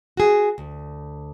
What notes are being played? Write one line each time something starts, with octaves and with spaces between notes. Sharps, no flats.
F#4 G#4
D2